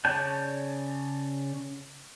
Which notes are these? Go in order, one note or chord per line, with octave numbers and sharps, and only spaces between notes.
C#3 C#5 D5 A5 G6